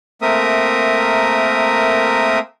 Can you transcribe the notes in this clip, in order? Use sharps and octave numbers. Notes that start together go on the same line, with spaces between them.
A3 A#3 C4 A#4 E5 D#6